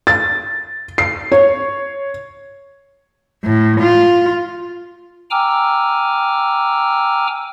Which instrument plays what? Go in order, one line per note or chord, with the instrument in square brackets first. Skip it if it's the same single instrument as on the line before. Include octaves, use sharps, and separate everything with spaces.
[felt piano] A6
C7
C#5
[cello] A2
F4
[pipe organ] G5 G#5 A#5 D6 E6 F6